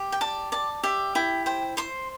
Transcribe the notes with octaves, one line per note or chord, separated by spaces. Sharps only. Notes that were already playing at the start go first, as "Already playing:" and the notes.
Already playing: G4
G5
D5 A5
D5 A5
G4 E5
E4 G5
C5 G5
C5 C6